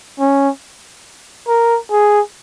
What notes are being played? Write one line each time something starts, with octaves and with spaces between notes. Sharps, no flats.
C#4
A#4
G#4